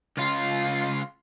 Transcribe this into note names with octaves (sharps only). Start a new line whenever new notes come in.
C#2 F4